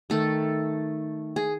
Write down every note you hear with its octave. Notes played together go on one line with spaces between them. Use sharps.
D#3 A3 A4
G#4